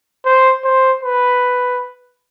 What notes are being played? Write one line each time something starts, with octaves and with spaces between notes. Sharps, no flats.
C5
C5
B4